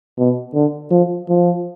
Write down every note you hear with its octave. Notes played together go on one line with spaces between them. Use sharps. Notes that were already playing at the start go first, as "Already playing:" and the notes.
B2
D3
F3
F3